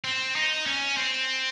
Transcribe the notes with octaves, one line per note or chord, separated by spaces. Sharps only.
C4
D#4
C#4
C4